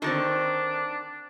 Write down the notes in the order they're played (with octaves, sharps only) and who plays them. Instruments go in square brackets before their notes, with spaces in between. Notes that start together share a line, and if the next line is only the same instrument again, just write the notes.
[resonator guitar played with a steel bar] D3 D#3 [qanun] C4 A5 C#6 [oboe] D4